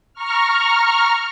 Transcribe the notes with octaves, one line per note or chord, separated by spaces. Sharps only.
A#5 C#6 F6